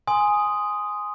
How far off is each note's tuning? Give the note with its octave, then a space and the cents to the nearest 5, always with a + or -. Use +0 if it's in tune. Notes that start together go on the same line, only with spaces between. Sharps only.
G#5 +0 C6 -10 D#6 +0